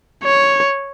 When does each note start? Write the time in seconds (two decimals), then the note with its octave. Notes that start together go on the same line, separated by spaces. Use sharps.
0.24 C#5